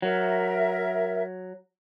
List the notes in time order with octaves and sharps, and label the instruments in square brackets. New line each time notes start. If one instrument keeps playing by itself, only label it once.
[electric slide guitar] F#3 [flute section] A#4 E5